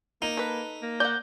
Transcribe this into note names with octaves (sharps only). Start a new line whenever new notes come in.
A#3 D#4
A4 B4
A#3
D5 F#5 G6